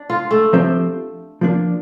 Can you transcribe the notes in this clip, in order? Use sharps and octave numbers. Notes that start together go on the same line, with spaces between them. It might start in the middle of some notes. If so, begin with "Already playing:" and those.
Already playing: D4
F4
A3
F3 C4 G4 C5 E5
F3 A#3 D4